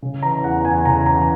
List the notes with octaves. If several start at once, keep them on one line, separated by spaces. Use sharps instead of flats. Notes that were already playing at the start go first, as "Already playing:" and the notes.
C#3
E3 A#5
E2 F#5
E2 G#5
C#3 A#5
E3 A#5